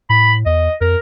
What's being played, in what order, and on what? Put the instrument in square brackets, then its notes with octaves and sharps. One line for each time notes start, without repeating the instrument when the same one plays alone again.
[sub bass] A2 [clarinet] B5
[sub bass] E2 [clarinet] D#5
[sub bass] F2 [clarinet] A#4